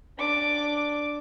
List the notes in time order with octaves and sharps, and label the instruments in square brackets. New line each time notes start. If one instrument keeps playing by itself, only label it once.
[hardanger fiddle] D4 D6